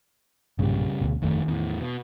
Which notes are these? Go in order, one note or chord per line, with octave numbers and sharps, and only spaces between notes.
B1 G2 A#2 C#3 G3
D2 B2
G1 F2 D#3 A3
E2 A2
B2